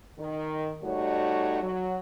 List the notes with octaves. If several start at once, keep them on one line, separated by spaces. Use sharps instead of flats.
D#3
G3 A3 D#4 F#4 C#5
F#3